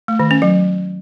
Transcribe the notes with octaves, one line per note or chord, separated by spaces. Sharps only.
A3
D#3
C#4
F#3